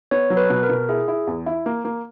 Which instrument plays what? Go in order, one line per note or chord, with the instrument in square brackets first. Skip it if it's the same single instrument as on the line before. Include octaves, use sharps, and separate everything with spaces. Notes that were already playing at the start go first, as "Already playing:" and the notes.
[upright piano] B3 [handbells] C#5
[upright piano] F#3
[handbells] B4
[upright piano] B2
[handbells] A#4
[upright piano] B2
[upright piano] E4 [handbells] G#4
[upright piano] E4
E2
E4
A#3
A#3